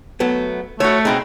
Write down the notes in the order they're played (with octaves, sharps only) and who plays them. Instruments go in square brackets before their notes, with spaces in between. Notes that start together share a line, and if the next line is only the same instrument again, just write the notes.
[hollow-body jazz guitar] F#3 A3 B3
[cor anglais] A3 [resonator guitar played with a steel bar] F#4 C#5 [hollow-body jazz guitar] E5
[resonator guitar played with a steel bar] B2 C4 G#4 [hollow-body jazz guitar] D#4